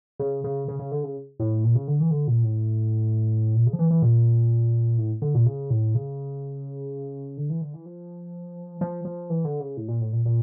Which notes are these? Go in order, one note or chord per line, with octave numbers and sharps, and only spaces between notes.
C#3
C#3
C#3
C#3
D3
C#3
A2
A#2
C#3
D3
E3
D3
A#2
A2
A#2
C#3
F3
E3
E3
A#2
A2
D3
A#2
C#3
A2
C#3
D3
E3
D3
E3
F3
F3
F3
E3
D3
C#3
A2
A#2
A2
A#2
A#2